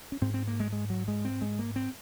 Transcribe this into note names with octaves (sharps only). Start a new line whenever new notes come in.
C#4
G#2 C4
C4
A#3
G#3
G#3
F#3
G#3
C4
G#3
A#3
C4